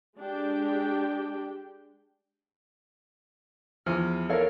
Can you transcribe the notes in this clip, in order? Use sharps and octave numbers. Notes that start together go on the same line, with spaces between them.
G#3 D4 G4 G5
E2 E3 F3 F6
A4 A#4 C#5 F5